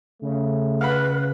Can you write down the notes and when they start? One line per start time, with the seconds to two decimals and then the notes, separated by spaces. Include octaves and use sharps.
0.22 C#3 A3
0.81 B4 F5 F#5 B5